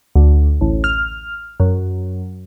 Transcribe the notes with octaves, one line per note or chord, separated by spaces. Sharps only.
D2
A1
F6
F#2